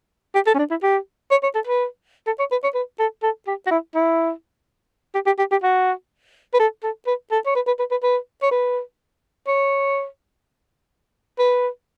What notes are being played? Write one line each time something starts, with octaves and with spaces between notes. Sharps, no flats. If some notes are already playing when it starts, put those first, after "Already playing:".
G4
A4
C#4
D4
E4
G4
C#5
C#5
A4
B4
A4
C#5
B4
C#5
B4
A4
A4
G4
F#4
E4
E4
G4
G4
G4
G4
F#4
B4
A4
A4
B4
A4
C#5
B4
B4
B4
B4
B4
C#5
B4
C#5
B4